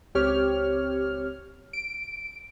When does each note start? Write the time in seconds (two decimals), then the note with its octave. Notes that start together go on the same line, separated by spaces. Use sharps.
0.15 C#2 C4 G4 C#5 F6
1.73 D7